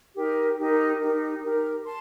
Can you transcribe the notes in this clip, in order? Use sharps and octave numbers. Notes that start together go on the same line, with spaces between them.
D#4 G4 A#4
D#4 G4 A#4
D#4 G4 A#4
D#4 G4 A#4
A5 C6